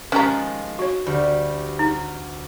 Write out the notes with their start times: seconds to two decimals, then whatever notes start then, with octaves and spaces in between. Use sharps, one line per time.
0.12 D#3 F3 G#3 C#4 G4 A#5 F#6 A6
0.79 F#4 C#5
1.07 D2 G3
1.79 D#4